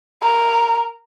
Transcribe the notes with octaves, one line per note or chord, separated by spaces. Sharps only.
A#4